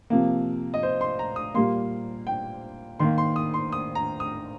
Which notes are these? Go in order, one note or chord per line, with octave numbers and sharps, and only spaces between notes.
C3 F3 A#3
D#5
C5
C6
A#5
D#6
A#2 G3 A#3 C6
G5
D#3 A#3 C6
C6
D#6
C6
D#6
A#5
D#6